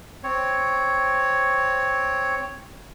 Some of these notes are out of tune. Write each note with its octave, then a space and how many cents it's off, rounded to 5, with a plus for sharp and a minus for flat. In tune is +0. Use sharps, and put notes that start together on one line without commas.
C4 +0 C#5 +0